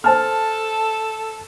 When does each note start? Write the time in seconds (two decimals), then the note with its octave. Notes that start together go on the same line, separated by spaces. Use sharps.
0.04 A4 C5 A5 F6